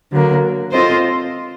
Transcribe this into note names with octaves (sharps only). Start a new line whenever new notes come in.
D3 F#3 A#3
C4 F4 A4 C5 D#5